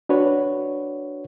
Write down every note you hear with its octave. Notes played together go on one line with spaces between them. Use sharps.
D4 F#4 B4 C#5